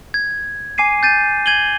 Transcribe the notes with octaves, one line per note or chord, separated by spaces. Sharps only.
G#6
G#5 D6 C7 D#7
G6 A6 D#7
G#6 D#7 F#7 G7